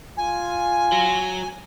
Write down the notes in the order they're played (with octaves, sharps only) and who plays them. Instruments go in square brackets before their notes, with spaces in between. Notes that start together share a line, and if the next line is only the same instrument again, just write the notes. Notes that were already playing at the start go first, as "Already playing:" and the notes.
[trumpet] F4 [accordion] G#5
[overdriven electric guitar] F#3